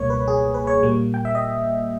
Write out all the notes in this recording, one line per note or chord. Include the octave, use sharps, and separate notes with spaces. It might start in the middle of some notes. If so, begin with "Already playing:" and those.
Already playing: C#2 B2 G3 A#3 C#5
B4
G#4
B4
C#5
A#2 G3 A#3
G5
E5
D#5